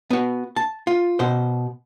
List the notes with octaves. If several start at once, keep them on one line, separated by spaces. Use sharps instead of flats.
B3 F#4
A5
F4
B2 C5